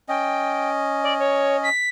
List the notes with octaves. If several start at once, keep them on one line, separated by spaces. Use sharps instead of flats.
C#4 D#5 G5
D5
C#5
B6